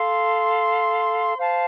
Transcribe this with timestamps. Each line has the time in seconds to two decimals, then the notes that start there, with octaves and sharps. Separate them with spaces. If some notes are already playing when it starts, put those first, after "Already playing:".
Already playing: A4 F5 C6
1.37 C5 F5 A5